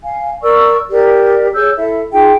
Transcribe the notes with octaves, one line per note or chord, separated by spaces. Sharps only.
F5 G#5
A#4 D5 C#6 E6
G4 A#4 D5
G#4 C#5 E6 G6
E4 A4 E5
D#4 F4 G#4 G5